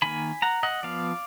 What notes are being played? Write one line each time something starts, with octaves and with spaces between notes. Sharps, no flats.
D#3 A#3 G#5 B5
F#5 A#5
D#5 F#5
F3 B3 D5 F5